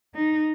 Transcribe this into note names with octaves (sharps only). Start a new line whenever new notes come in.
D#4